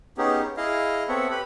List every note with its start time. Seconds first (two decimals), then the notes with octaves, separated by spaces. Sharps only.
0.18 B3 C#4 D#4 G4 G#4
0.57 E4 G#4 D#5 F5
1.08 B3 C4 A4 C#5 E5 F#5
1.31 G4 B4 B5